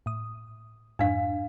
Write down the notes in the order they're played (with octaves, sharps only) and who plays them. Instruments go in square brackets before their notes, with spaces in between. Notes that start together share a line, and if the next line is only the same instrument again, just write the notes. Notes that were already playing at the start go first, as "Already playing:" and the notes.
[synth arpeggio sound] A2 D#6
[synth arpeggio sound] F2 G#2 [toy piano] D4 F5